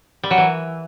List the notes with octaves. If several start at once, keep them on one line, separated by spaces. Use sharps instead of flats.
G3
F#3
E3